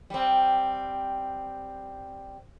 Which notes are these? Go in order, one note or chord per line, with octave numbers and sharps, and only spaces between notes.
G3 C4